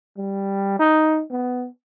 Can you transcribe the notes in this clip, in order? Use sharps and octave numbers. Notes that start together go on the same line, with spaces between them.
G3
D#4
B3